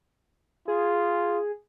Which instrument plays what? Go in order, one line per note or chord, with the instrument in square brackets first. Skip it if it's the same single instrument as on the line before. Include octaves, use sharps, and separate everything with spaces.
[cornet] F4 [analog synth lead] G#4